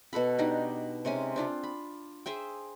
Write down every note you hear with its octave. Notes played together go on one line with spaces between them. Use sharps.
B2 F#4 A4 B5
D4 D#4 G4
C3 G#3 C#4 G#5
C4 D4 F4
B5
G#4 C5 E5 G5